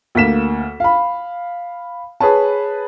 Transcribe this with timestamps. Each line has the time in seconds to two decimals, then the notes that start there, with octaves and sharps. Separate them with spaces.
0.15 D2 A#3 B6 E7
0.80 F5 B5
2.20 G#4 B4 C#5 A5